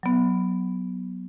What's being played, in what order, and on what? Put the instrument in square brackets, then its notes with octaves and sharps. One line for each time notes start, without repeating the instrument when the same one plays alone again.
[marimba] F#3 B3